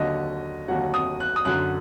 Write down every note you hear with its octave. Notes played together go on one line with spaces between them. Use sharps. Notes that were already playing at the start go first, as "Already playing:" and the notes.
Already playing: D#2 D3 F#3 D#5
D#2 D3 F#3 F#5
D#6
F#6
D#6
F#2 D3 F#3 F#6